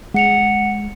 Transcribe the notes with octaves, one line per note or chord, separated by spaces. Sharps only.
G#3 F#5 C#7 F7